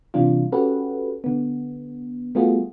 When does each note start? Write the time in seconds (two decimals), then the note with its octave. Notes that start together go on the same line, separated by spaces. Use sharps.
0.14 C3 E3 G3 D4 F4
0.52 C#4 F#4 G4 A4 B4
1.24 D3 B3
2.35 G3 A3 B3 F4 F#4 G#4